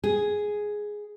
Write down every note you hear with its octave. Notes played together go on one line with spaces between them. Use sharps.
G#4